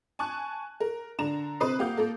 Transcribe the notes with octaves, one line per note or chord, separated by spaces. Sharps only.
G#5 A5 C#6 F#6
A#4
D3 D4 A#5 E7
C3 C4 B4 C5 D#6 C7
A#3 G4 F5 F#5 G6
A#3 A4 A#4